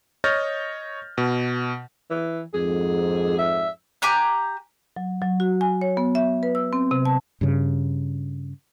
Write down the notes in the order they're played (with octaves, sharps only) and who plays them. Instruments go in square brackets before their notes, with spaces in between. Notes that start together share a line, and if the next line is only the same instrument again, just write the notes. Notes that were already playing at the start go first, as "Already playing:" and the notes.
[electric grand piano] C#5 D#5 F6 G6 A6 A#6
B2
[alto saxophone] E3
[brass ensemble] F2 G#2 [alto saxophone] G#4
[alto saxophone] E5
[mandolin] G4 G#5 A#5 F#6
[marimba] F#3
F#3
F#4
G#5
C#5
B3
E5
B4
E6
C4
C3
A5
[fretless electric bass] G2 C#3